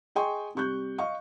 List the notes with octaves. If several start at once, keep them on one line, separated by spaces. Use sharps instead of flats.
G#4 D#5 G5 G#5 C6 C#6
C3 G3 C#6 F#6 G6
D#5 F5 C#6